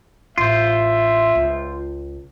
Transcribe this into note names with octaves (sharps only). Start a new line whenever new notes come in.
A1 F4 C5 E5
C#2